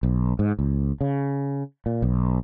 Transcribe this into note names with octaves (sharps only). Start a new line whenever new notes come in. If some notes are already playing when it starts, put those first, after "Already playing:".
B1
G#2
C#2
C#3
A#2
B1